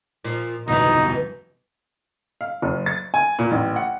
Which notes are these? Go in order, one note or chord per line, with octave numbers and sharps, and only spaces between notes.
A#2 F3
G1 C2 F2 B2 E3 D#4
F5
F#1
A6
G#5
A#2
A1
F#5